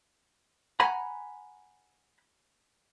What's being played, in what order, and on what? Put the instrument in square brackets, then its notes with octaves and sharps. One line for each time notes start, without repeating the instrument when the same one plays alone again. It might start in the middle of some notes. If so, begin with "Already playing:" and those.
[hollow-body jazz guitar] F#5 G#5 A#5 B5